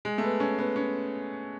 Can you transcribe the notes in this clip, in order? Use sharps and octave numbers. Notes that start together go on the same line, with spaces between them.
G#3
A3
B3
C#4
B3
C#4